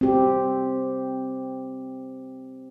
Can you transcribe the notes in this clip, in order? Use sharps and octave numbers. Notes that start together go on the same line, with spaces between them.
C4 G4